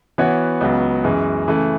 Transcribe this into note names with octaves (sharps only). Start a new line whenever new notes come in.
E3 B3 F#4 C#5
C#2 C#3 F#3 B3
F#2 E3 G#3
C#3 E3 A3